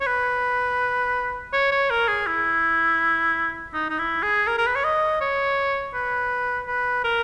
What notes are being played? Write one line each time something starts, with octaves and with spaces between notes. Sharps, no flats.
C#5
B4
C#5
C#5
A#4
G#4
E4
D#4
D#4
E4
G#4
A#4
A#4
B4
C#5
D#5
C#5
B4
B4
A#4